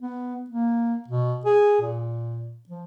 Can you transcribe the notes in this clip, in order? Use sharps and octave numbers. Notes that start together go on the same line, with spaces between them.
B3
A#3
B2
G#4
A#2
F3